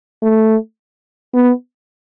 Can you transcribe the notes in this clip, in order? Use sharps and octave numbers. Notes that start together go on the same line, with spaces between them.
A3
B3